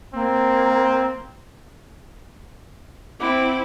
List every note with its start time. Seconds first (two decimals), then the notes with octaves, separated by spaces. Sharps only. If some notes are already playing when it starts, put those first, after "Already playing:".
0.14 A#3 C4
3.20 C4 E4 F#5 B5 D6